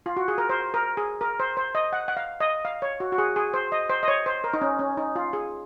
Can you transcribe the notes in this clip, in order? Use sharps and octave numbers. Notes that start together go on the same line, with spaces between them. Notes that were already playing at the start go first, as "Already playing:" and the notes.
F4
F#4
G#4
A#4
C5
A#4
G#4
A#4
C5
C5
D#5
F#5
F#5
F5
D#5
F5
C#5
F#4
F#4
G#4
G#4
C5
D#5
C5
D#5
C#5
C5
A#4
D#4
C#4
C#4
D#4
F4
G#4